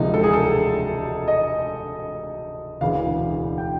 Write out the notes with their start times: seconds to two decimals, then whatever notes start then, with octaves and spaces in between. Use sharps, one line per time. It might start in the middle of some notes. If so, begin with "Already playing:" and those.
Already playing: E1 D2 C3 F3 G#3 D#4
0.14 A4
0.23 G#4
0.33 A4
1.28 D#5
2.81 E1 D2 C#3 E3 F5
3.58 G5